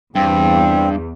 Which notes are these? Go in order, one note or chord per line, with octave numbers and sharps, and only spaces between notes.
E2 G2 C4